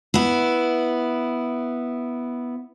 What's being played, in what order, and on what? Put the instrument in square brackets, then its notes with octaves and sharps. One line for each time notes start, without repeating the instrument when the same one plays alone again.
[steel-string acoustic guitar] B3 E4